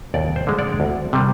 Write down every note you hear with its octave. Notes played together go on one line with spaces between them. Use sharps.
D#2 D5
C5
D3 G#3
D5
D2
C3 G3